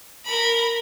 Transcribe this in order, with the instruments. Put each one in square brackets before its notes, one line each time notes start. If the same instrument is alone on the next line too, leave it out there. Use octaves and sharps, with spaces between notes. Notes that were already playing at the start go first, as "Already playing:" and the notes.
[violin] A#4 B5